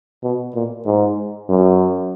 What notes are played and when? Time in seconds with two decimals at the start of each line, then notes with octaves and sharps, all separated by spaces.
0.23 B2
0.54 A#2
0.86 G#2
1.49 F#2